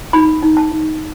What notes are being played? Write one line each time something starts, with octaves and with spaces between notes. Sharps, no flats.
D#4 B5
D#4
A5
D#4